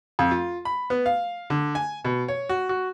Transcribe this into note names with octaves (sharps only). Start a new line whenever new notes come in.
F2
F4
B5
B3
F5
D3
G#5
B2
C#5
F#4
F#4